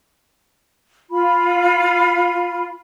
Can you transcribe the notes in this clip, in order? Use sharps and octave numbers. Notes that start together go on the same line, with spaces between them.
F4 B5